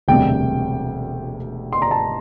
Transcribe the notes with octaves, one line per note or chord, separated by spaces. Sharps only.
E1 D2 C3 G3 G5
C6
A#5
A5